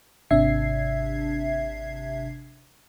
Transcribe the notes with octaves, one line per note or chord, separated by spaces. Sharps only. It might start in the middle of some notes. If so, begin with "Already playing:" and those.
G#1 C3 D4 E5 G#6 C7